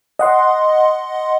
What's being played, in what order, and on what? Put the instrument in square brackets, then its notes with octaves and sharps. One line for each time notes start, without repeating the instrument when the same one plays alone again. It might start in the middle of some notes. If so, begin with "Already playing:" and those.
[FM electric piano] D#5 F#5 C6